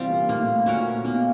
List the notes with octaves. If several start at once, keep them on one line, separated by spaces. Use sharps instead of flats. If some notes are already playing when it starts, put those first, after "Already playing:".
Already playing: C3 E3 G3 C4 F4
A#2
A2 A#3
A#2 C#4 F#4 A#4
B2 A#3